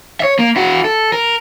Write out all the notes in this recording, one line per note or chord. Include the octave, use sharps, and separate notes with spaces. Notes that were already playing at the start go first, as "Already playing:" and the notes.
C#5 E5
A#3
E4 F#4
A4
A#4